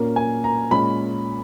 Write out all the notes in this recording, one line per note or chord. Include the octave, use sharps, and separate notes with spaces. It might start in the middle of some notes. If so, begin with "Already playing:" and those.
Already playing: A#2 A#3 C#4
G#5
A#5
A#2 G#3 C#4 B5